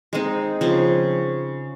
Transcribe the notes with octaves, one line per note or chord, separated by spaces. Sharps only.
G#3 C4 D#4
C#3 F3 C4